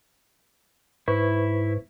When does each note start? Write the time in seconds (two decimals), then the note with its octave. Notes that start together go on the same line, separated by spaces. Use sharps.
1.08 G#2 E4 B4 C5 C#6